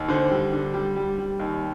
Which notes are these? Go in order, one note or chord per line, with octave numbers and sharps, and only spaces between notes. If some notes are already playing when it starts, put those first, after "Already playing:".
Already playing: D#2
D3 C5
G3
D3
G3
G3
G3
D#2